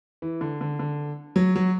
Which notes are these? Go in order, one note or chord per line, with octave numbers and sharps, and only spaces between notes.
E3
D3
D3
D3
F#3
F#3